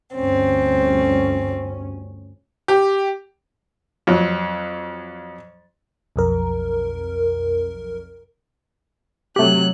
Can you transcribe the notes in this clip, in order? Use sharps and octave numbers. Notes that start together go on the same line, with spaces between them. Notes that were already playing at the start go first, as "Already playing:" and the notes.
G1 D2 C4 C#4
G4
F2 F#3
B1 F2 A#4
C3 F#3 A3 G4 F#6